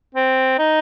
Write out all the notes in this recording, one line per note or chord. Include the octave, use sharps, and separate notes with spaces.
C4
D#4